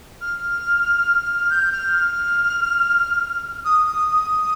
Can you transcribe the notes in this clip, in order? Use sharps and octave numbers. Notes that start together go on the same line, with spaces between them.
F6
G6
F6
F6
D#6
D#6
D#6